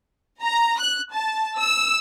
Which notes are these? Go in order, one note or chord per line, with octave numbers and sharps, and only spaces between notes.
A#5
F#6
A5
E6